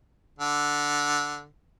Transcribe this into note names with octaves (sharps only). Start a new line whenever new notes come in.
D3